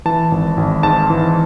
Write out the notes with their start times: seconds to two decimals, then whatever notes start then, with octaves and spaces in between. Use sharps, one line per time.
0.05 E3 A5
0.32 G#1
0.57 G#1
0.83 G#2 A5
1.10 E3